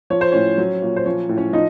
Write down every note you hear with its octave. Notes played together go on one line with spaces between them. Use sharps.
F3 C#5
C5
A2 C#4 C#5
F#3
A#2
C5
F3 C#4 C#5
A2
C#4 C#5
F3 D#4 D#5